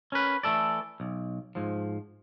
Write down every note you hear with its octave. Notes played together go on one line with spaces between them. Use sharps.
C#4 A#4 B4
E3 A3 A4 D5
B1
G#2 F3